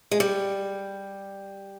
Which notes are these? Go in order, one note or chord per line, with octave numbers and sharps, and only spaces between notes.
G#3
G3